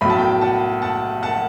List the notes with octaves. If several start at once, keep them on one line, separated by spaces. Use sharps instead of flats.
B1 A2 F#3 B5
A5
G5 B5
F#5 A5
F#5 A5
F#5 A5